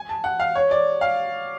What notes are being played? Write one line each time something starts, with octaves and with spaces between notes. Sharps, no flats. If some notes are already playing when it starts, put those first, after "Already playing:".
Already playing: G#5
A5
F#5
F5
C#5
D5
F5